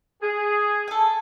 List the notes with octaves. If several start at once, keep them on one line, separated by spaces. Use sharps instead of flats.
G#4
A4 G#5